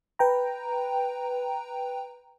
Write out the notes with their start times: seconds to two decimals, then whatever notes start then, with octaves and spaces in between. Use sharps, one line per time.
0.19 B4 G5 A#5